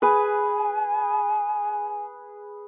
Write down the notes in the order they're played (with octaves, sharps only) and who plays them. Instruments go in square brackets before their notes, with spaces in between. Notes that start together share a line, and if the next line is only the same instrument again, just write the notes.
[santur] G#4 B4 [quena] G#5